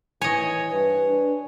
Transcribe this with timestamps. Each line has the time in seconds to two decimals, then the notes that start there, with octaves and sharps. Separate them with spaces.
0.22 E3 C#5 D#5 G#5
0.70 G2 B4
1.07 D4